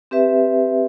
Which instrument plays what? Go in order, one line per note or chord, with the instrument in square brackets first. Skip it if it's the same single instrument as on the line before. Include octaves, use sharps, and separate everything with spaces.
[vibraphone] C4 G4 B4 E5